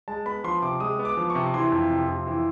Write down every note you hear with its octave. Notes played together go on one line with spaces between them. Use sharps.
G#3 A5
B3 B5
F3 C6
C3 D6
G#3 D#6
B3
D6
F3
C#6
C3
E3 C6
F2
C3
F2
E3